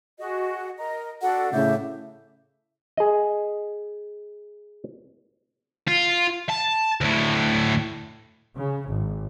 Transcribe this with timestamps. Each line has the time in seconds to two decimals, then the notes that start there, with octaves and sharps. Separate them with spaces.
0.19 F#4 G#4 D#5
0.77 A#4 D#5 A#5
1.22 D4 F#4 A4 F#5
1.53 A2 C#3 E5 D6 G6
2.97 G#4 D#5
5.88 F4
6.50 A5
7.01 D2 A2
8.57 C#3
8.90 G#1